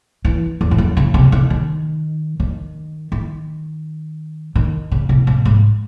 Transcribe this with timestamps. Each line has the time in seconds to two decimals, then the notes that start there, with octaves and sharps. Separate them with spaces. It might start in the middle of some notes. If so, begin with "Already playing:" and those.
0.25 E3
0.61 E2
0.71 G#2
0.78 F#2
0.97 C#3
1.14 C3
1.32 D#3
1.50 D#3
2.40 D#3
3.12 D#3
4.55 D#3
4.92 C#3
5.09 C3
5.27 G#2
5.45 G#2